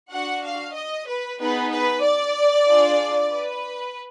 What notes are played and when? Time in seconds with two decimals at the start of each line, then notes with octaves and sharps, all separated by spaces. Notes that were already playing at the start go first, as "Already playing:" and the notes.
0.11 D4 F#4 F#5
0.43 F5
0.75 D#5
1.07 B4
1.39 B3 D#4 G#4 B4
1.71 B4
2.03 D5
2.67 D4 F4 G#4
3.31 B4